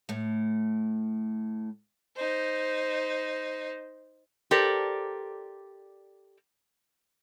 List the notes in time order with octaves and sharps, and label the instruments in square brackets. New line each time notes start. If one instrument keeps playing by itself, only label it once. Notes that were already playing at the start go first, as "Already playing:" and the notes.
[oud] A2 A3
[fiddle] D#4 C5
[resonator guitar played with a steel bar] G4 A4 A#4 C5 D5